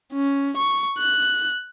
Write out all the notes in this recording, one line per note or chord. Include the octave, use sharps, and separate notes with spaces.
C#4
C#6
F#6